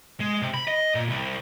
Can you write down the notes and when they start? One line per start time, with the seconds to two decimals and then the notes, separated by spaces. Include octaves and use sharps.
0.20 G#3
0.42 C3
0.54 B5
0.68 D#5
0.95 A#2
1.09 C2